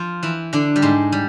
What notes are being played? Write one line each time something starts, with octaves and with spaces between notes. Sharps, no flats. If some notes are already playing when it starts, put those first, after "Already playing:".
Already playing: F3 F4
E3 E4
D3 D4
G3
G#2 G#3
G3